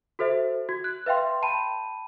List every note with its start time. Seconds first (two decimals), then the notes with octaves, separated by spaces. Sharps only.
0.19 F#4 A4 C5 E5
0.69 F#4 G#6
0.84 F#6
1.06 B4 E5 F5 G5 C6
1.42 G5 A5 B5 D#7